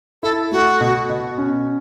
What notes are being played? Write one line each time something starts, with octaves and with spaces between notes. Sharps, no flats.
E4 A4
A3 F#4
B2
B2
C#4